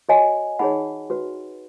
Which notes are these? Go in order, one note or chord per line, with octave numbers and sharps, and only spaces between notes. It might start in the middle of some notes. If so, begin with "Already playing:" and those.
F#4 C#5 D#5 G#5
D#4 G#4 C#5 F#5 B5
F#4 B4